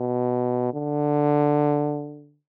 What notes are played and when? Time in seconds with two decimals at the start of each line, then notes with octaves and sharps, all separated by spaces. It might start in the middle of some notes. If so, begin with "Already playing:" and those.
Already playing: B2
0.74 D3